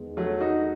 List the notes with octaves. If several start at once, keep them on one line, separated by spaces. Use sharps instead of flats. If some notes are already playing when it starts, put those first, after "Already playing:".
Already playing: E2 D#3 G#3 B3
F#3 A3
D#4 F#4